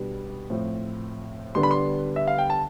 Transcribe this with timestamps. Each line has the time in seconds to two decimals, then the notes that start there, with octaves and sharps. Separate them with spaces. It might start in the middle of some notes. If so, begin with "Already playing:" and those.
Already playing: B2 G3 B3 D4
0.50 A2 F3 C4
1.55 D3 G3 B3 D4 C6
1.63 B5
1.71 C6
2.16 E5
2.28 F5
2.38 G5
2.50 A5